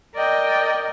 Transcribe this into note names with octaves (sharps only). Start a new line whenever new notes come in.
A#4 D5 D#5 G5